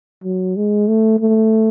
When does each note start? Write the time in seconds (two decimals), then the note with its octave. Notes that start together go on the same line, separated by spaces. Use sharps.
0.24 F#3
0.56 G#3
0.88 A3
1.20 A3